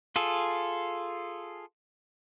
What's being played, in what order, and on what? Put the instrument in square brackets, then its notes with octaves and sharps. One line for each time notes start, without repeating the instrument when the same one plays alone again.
[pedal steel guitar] F4 G#4 A4